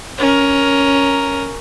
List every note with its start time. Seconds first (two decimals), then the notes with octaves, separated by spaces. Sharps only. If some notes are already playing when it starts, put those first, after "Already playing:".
0.18 C#4 A#4